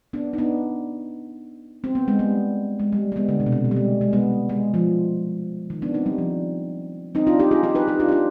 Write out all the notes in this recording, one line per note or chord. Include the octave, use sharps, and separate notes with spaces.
B3 D4
D#4
B3 D4
C4
B3
G#3
G3 B3
G#3
G3
G#3
G3 B3
D3
C3
B2
C3
B2
G3
G#3
G#3
G3 B3
G#3
F3
D#3
B3 D4
C4 D#4
G3
F3
C4 D#4
D4 F4
D#4 G4
F4 G#4
D#4 G4
G4 B4
D#4 G4
D4 F4
G4
D4 F4